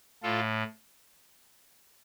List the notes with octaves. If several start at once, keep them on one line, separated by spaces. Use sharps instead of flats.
A2 F4 A4